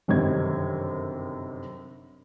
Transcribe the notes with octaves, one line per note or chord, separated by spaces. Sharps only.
G1 F#2 C3 D#3 G#6